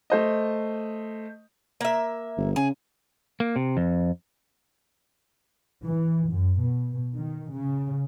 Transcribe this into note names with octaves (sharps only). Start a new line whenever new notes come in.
A3 C5 D#5
A#3 E5
G1
C#3 G#4
A#3
C3
F2
E3
F#2
B2
D#3
C#3